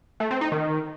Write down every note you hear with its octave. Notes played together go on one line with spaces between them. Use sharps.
A3
C4
D#4
D#3